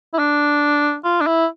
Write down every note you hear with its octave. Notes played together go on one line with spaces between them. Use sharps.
E4
D4
F4
D4
E4